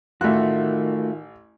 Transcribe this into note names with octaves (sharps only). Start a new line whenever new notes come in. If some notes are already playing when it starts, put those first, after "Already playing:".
A1 D#3 A3 F4 F#4 E5 F#6